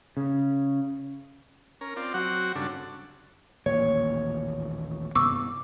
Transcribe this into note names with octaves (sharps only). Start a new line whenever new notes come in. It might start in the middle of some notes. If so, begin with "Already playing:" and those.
C#3
C#4 A#4
C4 F4 D5
F#3 C4 F#4 F#5
G2 C#3 D4 A4
A1 D#2 A#2 C#5
G2 C3 B3 C#6 D6 E6